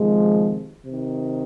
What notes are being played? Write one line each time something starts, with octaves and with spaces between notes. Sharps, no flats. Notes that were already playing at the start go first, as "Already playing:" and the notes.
Already playing: C3 D#3 F3 G#3
C3 D#3